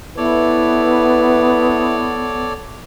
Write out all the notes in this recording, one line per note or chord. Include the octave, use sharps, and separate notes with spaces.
B3 E4 A4 B4 C#5 D5